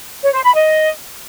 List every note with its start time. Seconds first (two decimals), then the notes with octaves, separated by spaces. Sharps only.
0.23 C#5
0.33 C5
0.44 B5
0.54 D#5